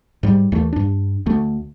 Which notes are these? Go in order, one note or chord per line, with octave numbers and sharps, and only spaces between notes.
G#2 G3
D#2 E3 A3
G2 D4
D2 A3